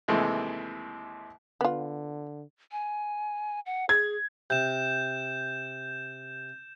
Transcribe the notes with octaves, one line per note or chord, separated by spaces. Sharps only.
D#2 C3 E3 G#3 A3
D3 B3 F4
G#5
F#5
G#4 G#6
C3 G6 E7